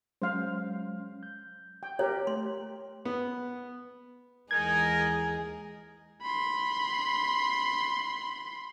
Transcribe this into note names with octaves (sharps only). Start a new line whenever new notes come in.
F#3 G#3 C#4 C5 F5
G6
G5
G4 A#4 C#5
A3 C6
B3
D#2 E3 G#3 D#4 G#4 A#4 G#6
B5 C6